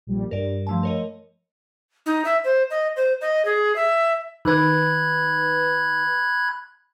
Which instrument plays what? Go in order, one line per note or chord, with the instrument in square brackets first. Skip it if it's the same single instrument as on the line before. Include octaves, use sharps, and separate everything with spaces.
[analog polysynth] A#1 G3
[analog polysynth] G2 [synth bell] A#4 D5
[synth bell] F3 A3 A5
A#4 C#5 D#5
[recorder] D#4
E5
C5
D#5
C5
D#5
G#4
E5
[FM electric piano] D#3 B4 [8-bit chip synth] B5 F#6 G#6